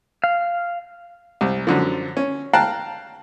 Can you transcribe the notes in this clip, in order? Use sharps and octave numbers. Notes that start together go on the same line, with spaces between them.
F5
C2
F#2 D3 F3
C#4
F5 G5 A5 A#5 F#6